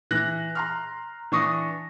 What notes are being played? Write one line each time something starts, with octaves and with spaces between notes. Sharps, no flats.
E3 F#6 A#6
A#5 C6 F6
E3 D4 C#6 D#6 A#6